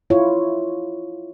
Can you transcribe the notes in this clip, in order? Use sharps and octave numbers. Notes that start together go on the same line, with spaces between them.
E4 F4 C#5